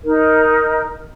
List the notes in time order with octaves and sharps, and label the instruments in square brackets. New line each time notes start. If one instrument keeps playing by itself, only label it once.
[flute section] D#4 A#4